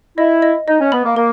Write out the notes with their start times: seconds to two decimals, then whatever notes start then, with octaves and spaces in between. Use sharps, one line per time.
0.18 E4 D#5
0.42 D#5
0.68 D#4 D#5
0.80 C#4
0.92 B3 B5
1.04 A#3
1.16 A#3 A#4